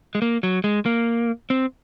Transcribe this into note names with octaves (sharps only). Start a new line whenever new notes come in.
G#3
A#3
F#3
G#3
A#3
C4